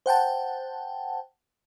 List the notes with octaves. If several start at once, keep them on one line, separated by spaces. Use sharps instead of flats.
C5 F#5 G5 A5